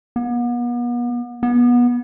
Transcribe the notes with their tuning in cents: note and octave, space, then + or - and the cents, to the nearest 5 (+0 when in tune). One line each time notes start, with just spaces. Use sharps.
B3 -40
B3 -25